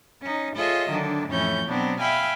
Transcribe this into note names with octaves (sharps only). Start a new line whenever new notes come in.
C#4 D#4
F4 G#4 A4 C#5 D#5 E5
D3 D#3 F#3 D4
F2 A2 E3 C#4 C#5 G6
B2 F#3 B3 C4 D4
E5 F5 G5 G#5 B5